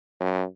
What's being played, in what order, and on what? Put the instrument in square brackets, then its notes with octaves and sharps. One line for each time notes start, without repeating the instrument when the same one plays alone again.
[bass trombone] F#2